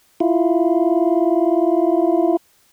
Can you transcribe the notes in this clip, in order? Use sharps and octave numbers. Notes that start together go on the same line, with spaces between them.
E4 F4